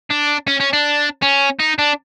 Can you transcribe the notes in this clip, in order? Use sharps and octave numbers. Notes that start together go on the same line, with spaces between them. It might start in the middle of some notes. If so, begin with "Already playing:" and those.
D4
C#4
C#4
D4
C#4
D#4
D4